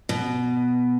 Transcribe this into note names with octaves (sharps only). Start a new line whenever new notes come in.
B2